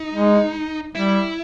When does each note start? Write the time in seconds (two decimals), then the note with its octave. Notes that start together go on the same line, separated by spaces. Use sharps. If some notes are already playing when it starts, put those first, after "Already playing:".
Already playing: D#4
0.14 G#3
0.95 G3 E4